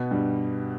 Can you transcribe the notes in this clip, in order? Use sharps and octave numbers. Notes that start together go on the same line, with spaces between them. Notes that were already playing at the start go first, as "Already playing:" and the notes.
Already playing: B2 B3
G2 G3